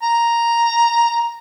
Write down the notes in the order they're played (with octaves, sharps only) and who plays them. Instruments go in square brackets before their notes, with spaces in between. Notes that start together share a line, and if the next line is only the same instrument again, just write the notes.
[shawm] A#5